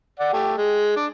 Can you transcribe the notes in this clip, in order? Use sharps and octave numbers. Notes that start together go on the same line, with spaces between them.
D5 F#5
A3 G4
G#3
D4